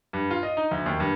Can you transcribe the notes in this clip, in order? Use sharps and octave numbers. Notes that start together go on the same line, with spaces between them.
G2
F4
D#5
D#4
D2
D#2
G2